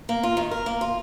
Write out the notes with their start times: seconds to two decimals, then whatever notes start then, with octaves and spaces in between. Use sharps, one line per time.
0.09 A#3
0.23 F4
0.37 D#3
0.51 A#4
0.66 A#3
0.81 F4